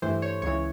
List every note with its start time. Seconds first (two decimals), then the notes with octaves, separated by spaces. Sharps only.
0.02 G2 E3 A3 C5
0.22 C#5
0.42 C#2 C#3 E3 C#5